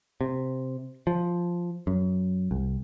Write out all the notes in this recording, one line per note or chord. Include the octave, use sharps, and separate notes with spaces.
C3
F3
F#2
C2